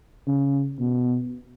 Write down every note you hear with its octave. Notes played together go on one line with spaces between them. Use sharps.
C#3
B2